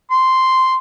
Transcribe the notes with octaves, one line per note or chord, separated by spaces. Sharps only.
C6